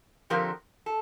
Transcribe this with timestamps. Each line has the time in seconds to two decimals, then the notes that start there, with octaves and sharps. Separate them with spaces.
0.30 D3 F3 C4 G4 A#4
0.86 A4